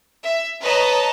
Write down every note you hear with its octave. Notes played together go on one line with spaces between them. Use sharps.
E5
B4 C#5 D#5 A5 A#5